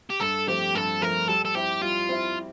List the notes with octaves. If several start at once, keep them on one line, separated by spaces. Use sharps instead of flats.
G4
G2 A4
F3 A3 C4 G4
G2 A4
F3 A3 C4 A#4
G3 A4
A4
C4 E4 G4
G3 F4
C4 E4